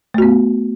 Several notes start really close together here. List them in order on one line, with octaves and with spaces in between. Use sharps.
A3 F#4 B3